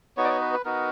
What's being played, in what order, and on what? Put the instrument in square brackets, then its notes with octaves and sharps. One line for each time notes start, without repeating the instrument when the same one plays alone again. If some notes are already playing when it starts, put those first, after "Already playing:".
[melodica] B3 D#4 F#4 C#5
D5
C#5
B4
B4
B3 D#4 F#4 A#4